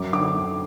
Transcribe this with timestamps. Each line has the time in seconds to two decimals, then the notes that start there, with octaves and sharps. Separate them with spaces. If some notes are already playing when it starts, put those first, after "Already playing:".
Already playing: F#2 D6
0.13 D3 D6